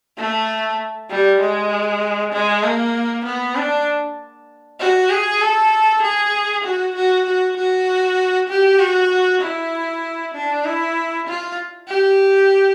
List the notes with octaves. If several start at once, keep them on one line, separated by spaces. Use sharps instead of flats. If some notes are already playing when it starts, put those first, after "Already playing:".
A3
G3
G#3
G#3
A#3
B3
D4
F#4
G#4
A4
G#4
F#4
F#4
F#4
F#4
G4
F#4
E4
D4
E4
F4
G4